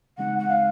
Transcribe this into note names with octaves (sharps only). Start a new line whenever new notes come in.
C#3 E3 G#3 C4 D#4 F#5
F#5
F5